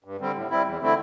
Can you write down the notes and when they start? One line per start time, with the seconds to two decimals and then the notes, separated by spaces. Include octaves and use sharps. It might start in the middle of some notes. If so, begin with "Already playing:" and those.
0.04 G2
0.20 D3 G3 C4
0.35 A2
0.50 G3 C4 E4
0.66 E2
0.81 D3 A3 C4 E4